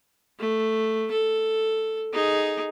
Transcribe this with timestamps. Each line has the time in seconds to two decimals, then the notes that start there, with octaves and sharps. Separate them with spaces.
0.39 A3
1.12 A4
2.13 D#4 G#4